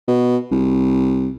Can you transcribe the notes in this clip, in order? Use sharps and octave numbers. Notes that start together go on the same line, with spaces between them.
B2
C2